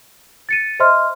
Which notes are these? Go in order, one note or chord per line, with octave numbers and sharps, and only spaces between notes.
A6 C#7 D#7
C5 D#5 E5 C6 F6